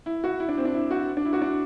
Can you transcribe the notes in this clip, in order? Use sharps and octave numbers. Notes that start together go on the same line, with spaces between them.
E4
F#4
E4
D4
C4
D4
E4
F#4
D4
E4
F#4
D4